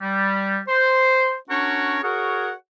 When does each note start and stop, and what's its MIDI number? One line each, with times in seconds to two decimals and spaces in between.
0.01 0.58 55
0.68 1.34 72
1.50 1.98 61
1.50 1.98 62
1.50 1.98 66
1.50 1.98 70
1.50 1.98 73
2.02 2.50 66
2.02 2.50 68
2.02 2.50 70
2.02 2.50 73
2.02 2.50 78